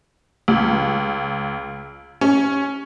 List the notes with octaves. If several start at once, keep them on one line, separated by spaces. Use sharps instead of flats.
C#2
C#4